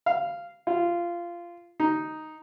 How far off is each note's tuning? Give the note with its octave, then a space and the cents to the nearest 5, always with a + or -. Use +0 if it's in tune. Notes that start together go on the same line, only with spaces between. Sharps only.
F5 -10
F4 -15
D#4 +0